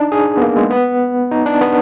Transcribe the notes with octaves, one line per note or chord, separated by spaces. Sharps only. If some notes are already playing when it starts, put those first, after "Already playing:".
Already playing: D4 D#4
G#4
B3
A#3
G#3
B3
D#4
D4
B3